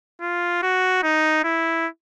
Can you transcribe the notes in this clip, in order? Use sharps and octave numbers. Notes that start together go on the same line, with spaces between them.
F4
F#4
D#4
E4